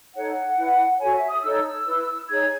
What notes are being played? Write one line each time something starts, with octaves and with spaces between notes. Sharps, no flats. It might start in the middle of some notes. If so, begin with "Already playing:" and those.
D#4 A4 C#5 F#5
E4 B4
F#4 A4 C#5 G#5
E5
D#6
D#4 A4 C#5 E6
E4 B4
D#4 G#4 C#5 G#6